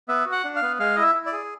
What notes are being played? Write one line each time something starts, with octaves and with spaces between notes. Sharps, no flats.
B3 E5
F#4
F#5
D4
F5
B3
G#3 F5
E4 D#5
E5
E4
D5
G#4